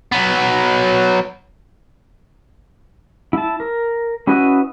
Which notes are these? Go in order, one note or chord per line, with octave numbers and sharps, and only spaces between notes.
F#3 B3
E4 A5
A#4
C#4 E4 F#4 B4 D#5